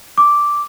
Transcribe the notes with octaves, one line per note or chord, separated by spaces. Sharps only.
D6